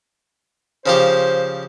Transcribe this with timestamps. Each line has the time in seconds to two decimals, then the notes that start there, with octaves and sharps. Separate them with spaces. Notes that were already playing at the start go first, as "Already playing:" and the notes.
0.86 C#3 F3 G4 C5